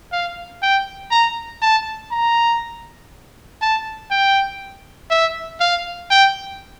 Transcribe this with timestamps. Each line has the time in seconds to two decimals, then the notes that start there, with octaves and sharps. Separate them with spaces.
0.12 F5
0.62 G5
1.11 A#5
1.62 A5
2.11 A#5
3.62 A5
4.11 G5
5.11 E5
5.60 F5
6.11 G5